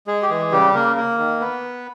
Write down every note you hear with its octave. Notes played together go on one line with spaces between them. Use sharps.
G#3 G#4
G4
E3 G#3 G#4
C#3 G3 G4
C#3 A#3 A#4
A#3 A#4
D#3
B3 B4